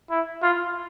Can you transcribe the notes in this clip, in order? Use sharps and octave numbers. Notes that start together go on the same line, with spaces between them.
E4
F4